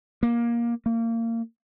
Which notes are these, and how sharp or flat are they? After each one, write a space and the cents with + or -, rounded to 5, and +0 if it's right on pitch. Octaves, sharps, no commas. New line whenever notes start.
A#3 +15
A#3 -25